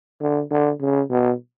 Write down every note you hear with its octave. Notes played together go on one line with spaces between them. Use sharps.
D3
D3
C#3
B2